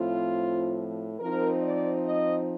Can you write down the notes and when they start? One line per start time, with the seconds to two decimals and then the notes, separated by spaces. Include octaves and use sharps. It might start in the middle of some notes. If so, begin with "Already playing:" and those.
Already playing: A2 F3 C4 F4
1.20 F3 C4 D#4 A#4
1.63 D5
2.06 D#5